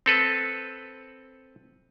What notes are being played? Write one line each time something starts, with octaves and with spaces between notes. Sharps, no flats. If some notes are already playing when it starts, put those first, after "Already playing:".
C4 A4 B4